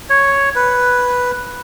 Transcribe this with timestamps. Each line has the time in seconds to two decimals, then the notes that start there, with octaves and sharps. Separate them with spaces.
0.10 C#5
0.56 B4